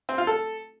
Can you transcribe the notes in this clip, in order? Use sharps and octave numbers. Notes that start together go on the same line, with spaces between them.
C4
F4
A4